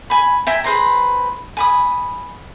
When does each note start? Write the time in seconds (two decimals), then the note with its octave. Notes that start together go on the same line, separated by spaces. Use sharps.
0.10 G#5 B5
0.47 E5 G5 G#5 A#5
0.64 G#4 B4 C5 A#5
1.57 G#5 B5 D#6